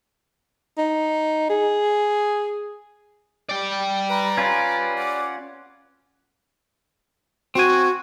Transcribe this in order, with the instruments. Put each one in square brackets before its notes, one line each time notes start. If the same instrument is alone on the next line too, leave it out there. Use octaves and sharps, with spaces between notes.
[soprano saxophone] D#4
G#4
[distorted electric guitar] D5 G5
[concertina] B4 [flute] A#5
[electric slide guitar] C#4 F4 [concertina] B4
[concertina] F#5 [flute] D6
[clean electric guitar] C4 G#5 [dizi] F#4